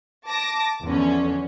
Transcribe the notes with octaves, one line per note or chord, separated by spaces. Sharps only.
A5 D6 A#6
E2 D3 F3 C#4